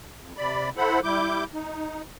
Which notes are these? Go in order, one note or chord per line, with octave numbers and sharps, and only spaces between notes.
F2
C3 D5 B5
E4 A4 C5 F#5 B5
G3 E4 D6 G6
D#4